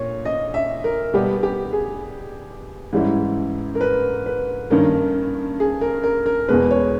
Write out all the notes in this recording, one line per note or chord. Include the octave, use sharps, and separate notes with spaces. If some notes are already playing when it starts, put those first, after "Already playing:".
Already playing: A#2 C#5
D#5
E5
A#4
B2 G3 B3 G4
G4
G#4
G#2 E3 G3 C#4 E4
A#4
B4
B4
G2 D#3 A#3 C#4 A#4
G#4
A#4
A#4
A#4
E2 B2 G#3 B4
C#5